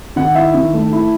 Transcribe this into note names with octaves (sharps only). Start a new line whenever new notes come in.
D#3 F#5
E4 E5
D#3
A3
E4